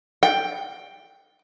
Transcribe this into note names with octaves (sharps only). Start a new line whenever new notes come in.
G5